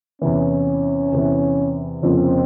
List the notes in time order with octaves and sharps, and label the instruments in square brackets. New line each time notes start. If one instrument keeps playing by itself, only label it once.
[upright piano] E2 C3 E3 [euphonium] C#4
[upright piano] E2 C3 E3
[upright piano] F1 F2 C#3 F3 A#3 [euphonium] C4